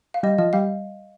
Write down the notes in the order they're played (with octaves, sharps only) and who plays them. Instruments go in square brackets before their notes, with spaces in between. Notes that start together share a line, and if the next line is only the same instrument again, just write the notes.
[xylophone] F5
[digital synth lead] G3 [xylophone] D#5
[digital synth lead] F3 [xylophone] D#5
[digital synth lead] G3 [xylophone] F5